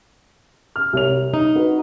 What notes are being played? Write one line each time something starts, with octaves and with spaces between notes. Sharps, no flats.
F6
C2 C#5 F7
D#4
F#4 B4